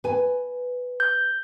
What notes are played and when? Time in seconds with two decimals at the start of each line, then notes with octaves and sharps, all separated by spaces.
0.04 B4 G#5
1.00 G6